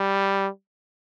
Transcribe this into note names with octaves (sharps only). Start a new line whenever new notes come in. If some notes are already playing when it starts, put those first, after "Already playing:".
Already playing: G3